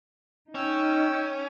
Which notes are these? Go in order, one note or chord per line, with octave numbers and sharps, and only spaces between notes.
C#4 D#4 G5 E6